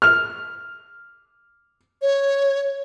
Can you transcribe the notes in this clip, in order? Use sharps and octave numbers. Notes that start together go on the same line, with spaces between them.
F6 F7
C#5